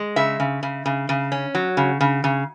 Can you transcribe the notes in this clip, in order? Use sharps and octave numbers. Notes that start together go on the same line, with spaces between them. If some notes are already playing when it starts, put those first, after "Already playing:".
Already playing: G#3
C#3 E5
C#3
C#3
C#3
C#3
C#4
F#3
C#3
C#3
C#3